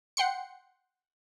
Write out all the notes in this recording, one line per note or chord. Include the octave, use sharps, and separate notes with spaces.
F#5 G5 C6 C#7